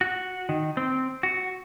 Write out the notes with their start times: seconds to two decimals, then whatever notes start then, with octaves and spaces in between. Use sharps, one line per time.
0.01 F#4
0.49 D#3
0.77 C4
1.23 F#4